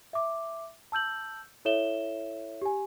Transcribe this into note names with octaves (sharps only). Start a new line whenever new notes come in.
E5 D6
A5 E6 G6 F#7
E4 A4 C#5 E5 E7 G7
G4 G#5